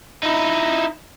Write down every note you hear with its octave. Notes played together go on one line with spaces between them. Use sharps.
D#4 E4